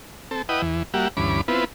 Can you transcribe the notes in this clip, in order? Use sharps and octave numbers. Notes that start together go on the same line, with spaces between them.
C4 A4
E4 B4 D#5 F#5 G5 D#6
E2 E3
G3 A#3 F#4 G4 E5 F#5
D2 G2 E3 C#4 B5 D6
B3 C4 E4 F4 B4